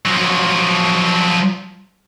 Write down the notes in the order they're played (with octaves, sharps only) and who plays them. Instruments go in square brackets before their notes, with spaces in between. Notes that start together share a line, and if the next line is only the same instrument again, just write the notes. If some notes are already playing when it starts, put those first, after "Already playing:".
[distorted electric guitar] F3 F#3